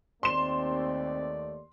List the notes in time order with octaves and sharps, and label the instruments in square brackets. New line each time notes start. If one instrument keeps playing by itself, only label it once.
[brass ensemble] D#2 A3 D5 [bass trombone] C4 [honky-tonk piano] C6 E7